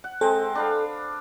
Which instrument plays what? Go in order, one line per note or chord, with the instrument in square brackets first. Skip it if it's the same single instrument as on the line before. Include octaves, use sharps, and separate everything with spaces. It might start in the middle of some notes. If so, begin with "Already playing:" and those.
[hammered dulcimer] F#5
[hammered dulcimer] G#3 C4 [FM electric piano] A4
[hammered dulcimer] D4 B4 F5